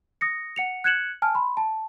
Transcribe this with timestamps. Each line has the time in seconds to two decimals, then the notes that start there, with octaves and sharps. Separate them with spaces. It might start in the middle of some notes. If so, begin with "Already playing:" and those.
0.21 D#6 A#6 C#7
0.56 F#5 C#7 F7
0.84 F#6 G#6 C#7 E7 F#7
1.22 G#5 A5 F6
1.35 B5 C6
1.57 A5